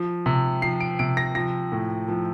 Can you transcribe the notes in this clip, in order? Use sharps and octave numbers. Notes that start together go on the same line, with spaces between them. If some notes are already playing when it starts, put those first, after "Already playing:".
Already playing: F3
C3
F3 C7
D7
C3 D7
A#6
F3 A#6
A2
F3